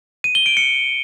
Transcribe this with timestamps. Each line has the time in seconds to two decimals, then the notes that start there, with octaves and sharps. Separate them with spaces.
0.24 D#7
0.35 G7
0.46 D7
0.57 C#7